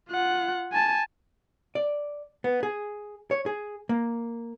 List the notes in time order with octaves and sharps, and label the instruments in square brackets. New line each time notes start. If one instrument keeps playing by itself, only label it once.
[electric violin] F4 F#5
G#5 A5
[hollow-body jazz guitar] D5
B3
G#4
C#5
G#4
A#3